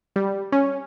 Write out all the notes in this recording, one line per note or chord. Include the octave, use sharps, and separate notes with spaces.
G3
C#4